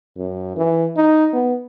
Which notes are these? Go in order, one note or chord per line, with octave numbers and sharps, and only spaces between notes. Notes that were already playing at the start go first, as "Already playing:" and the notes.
F#2
E3
D#4
B3